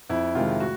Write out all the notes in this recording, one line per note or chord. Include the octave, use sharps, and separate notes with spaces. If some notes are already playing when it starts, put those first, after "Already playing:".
F2 E4
C3 D#3 G#3 F4
A2 F#4